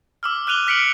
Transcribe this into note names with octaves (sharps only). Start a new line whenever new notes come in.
D6 E6 F6
D6 F#6 D#7 F7 G7
F6 B6 C#7 D7 F#7